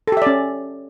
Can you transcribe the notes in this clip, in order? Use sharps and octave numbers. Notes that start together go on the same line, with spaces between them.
C#4 G4 A4 D5 E5